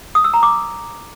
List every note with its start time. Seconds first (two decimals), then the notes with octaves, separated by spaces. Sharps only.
0.15 D#6
0.24 E6
0.34 A#5
0.43 D6